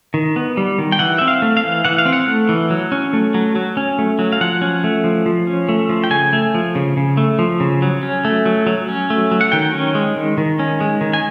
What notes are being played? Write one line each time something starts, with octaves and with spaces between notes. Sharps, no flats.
D#3
B3
G3
D#3
G5
E3 F#5
C4 E5
F5
A3
F5
E3
E3 F#5
F5
C4
F#5
A3
E3
F#3
C#4
A3
F#3
F#3
C#4
A3
F#3
F5
F3 F#5
C#4
A3
F3
F3
C#4
A3
F3
G5
C#3 G#5
A3
F3
C#3
C#3
A3
F3
C#3
F#3
C#4
A3
F#3
F#3
C#4
A3
F#3
F#5
D#3 G5
C#4
G#3
D#3
D#3
C#4
G#3
D#3
G#5